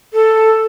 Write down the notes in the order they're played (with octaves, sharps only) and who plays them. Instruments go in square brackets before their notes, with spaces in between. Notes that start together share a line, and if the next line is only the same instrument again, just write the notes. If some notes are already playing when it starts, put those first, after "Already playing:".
[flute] A4